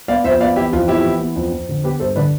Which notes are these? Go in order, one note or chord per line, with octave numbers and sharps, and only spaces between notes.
B3 D5 F5
F2 C5 E5
B3 D5 F5
E3 E4 G4
F2 F4
B3 E4 G4
E3
B3
F2
F2
D3
B3 G4 B4
G2 A4 C5
D3 B4 D5